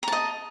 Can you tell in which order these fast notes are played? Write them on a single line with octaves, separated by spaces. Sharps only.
A#5 A5 D#5